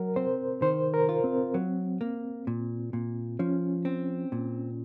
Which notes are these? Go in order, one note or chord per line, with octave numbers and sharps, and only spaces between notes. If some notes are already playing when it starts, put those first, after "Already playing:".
Already playing: F#3 A#4
C4 C5
D#3 C5
A#4
F4
C4
F#3
A#3
A#2
A#2
F3 C#4
C4
A#2